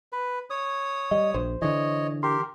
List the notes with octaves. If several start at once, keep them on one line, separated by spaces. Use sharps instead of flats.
B4
C#5 D#6
G3 D#5
A#1 C5
D3 E3 C#5 D#5
G4 A#4 C6